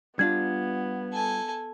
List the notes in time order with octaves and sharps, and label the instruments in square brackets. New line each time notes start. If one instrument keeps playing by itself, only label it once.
[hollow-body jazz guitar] G3 D4 F4 [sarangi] B3 [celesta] G#6
[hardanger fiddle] A4 G#5